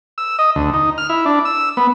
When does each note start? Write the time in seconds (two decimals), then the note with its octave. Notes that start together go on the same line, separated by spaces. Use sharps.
0.18 E6
0.39 D#5
0.56 D2
0.74 D#4
0.98 F6
1.09 E4
1.26 D4
1.45 E6
1.77 B3